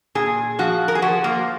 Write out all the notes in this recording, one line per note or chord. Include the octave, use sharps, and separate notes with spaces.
A#2 G#4
F3 F#4
A#4
G#4
F3 F#4
A#3